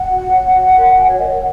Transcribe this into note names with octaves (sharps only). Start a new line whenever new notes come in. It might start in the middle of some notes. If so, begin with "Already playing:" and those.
Already playing: F#5
F#4
C#5
F#4
A#4 C#5
F#4 G#5
C#5
A#4 C#5 D#5
F#5